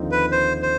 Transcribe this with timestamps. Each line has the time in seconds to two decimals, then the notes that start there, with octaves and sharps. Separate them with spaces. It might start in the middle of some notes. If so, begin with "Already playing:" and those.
Already playing: D#2 D3 F3 C4 D#4
0.12 B4
0.32 C5
0.62 C5